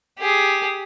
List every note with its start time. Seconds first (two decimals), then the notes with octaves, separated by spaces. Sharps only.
0.19 G4 G#4